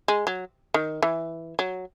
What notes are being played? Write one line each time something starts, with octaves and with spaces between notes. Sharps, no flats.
G#3
F#3
D#3
E3
F#3